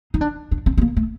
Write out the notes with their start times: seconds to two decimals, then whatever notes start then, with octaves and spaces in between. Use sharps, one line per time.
0.14 D#4
0.21 D4
0.51 D4
0.66 C4
0.78 C4
0.82 A#3
0.96 A3